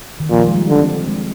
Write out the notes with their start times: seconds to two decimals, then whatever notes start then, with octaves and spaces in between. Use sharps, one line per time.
0.20 D#3
0.30 A#2 F3
0.47 G#3
0.56 G3
0.69 D3
0.82 C4
1.07 G#3